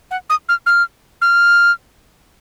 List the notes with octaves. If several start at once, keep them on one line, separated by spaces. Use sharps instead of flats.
F#5
D#6
F6
F6
F6